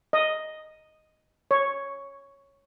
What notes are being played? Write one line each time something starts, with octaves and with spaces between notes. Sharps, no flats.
D#5
C#5